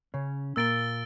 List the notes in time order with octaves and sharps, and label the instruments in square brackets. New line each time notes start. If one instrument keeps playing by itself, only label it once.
[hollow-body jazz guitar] C#3 C#4
[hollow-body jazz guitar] A#2 A#3 [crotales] E6 A6 D7 G7